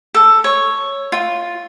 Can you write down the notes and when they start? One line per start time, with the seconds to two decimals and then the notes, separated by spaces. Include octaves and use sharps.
0.14 A4
0.44 C#5
1.12 F4